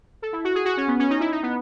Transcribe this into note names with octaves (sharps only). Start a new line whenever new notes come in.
A4
E4
F#4
G#4
F#4
C#4
B3
C#4
D#4
E4
D#4
B3